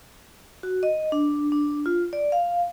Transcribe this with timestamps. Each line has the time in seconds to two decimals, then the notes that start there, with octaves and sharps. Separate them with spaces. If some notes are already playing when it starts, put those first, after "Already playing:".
0.63 F#4
0.83 D#5
1.12 D4
1.52 D4
1.86 F4
2.13 D5
2.32 F5